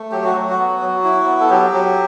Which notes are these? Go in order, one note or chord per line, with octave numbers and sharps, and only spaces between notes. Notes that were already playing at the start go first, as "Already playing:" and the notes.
Already playing: A3
F#3 G4
F#4
F#3
F#4
B3
F#3
E4
B3
A4
F#3 G4
F#3